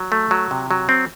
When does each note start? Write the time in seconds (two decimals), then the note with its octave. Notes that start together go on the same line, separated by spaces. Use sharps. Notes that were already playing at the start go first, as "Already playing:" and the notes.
Already playing: F#3
0.12 A3
0.31 F#3
0.51 C3
0.71 F#3
0.89 C4